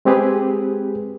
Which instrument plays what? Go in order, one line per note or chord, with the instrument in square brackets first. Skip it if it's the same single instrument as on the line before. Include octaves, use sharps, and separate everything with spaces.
[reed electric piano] G#3 C4 G4 G#4 B4